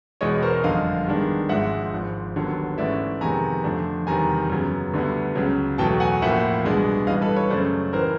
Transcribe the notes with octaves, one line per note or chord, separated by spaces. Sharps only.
E1 E2 B2 G#3 C#5 D#5
A#4 C5
G1 F2 D3 D#5 F5
G2 D#3 G#3 B3 D4
G#1 G#2 F3 G#3 E5 F#5
G#1 G#2 F3
D#2 D3 F#3 B3
G#2 E3 A3 C#4 D5 E5
F2 C3 D#3 G#3 B3 G#5 A#5
F2 D3 F3 A3 D4
E2 C3 D#3 G3 G#5 A#5
F#2 C#3 F#3 B3
D2 D3 G3 B3
C#2 C#3 F#3
E2 B2 F#3 A3 G5 A5
F#5 G#5
A1 A2 F3 A#3 E5 F#5
C2 B2 G#3 B3 D4
A1 G2 E3 G3 D#5 F5
A4 B4
B4 C#5
F#2 C#3 F#3 A3 C5 D5
A1 E3 A#4 C5